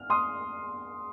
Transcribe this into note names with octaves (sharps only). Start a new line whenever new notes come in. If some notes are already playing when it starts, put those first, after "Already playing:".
Already playing: F6
C6 D#6